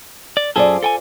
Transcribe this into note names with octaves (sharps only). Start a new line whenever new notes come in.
D5
F#2 F4 G#4 A4 C5 D5
A4 G5 G#5